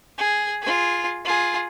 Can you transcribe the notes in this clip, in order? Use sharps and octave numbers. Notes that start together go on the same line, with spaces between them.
G#4
F4 G#4
F4 G#4